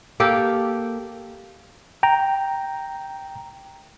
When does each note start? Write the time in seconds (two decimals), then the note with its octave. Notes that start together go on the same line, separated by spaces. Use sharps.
0.20 A#3 G4 A4
2.03 G5 A#5